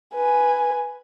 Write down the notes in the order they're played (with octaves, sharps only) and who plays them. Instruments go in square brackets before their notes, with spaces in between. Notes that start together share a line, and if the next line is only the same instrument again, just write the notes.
[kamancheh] B4 G#5